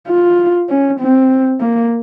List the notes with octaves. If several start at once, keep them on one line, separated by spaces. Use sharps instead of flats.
F4
C#4
C4
A#3